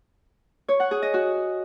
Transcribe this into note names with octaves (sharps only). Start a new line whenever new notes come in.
C#5
F#5
G#4
D#5
F#4